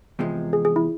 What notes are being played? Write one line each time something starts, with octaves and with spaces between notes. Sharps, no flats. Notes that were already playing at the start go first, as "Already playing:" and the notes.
E2 C3 F3 G#3
G#4
G#4
E4